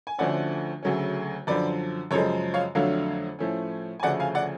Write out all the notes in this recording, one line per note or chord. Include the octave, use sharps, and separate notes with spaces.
G#5
D2 D3 F3 A3 C#4 D5 F#5
D2 C#3 F#3 A3 C#4
F#2 D3 F3 B4 D5
F#2 C#3 F3 G#3 A4 C#5
C#5 F5
F2 D3 F#3 A3 D4 C#5 F5
A2 F3 A3 C#4
G#5
D2 C#3 F3 A3 D5 F#5
F5 G#5
D5 F#5